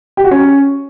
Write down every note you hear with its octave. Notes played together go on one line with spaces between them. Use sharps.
G4
F#4
C#4